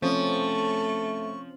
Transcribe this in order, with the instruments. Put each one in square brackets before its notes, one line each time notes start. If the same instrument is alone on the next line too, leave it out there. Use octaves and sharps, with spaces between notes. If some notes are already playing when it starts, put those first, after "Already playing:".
[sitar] F3 [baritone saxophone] A3 [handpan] C4 C#4 [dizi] C#6